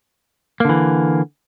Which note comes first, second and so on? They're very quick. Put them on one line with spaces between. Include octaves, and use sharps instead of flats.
A#3 D3 E3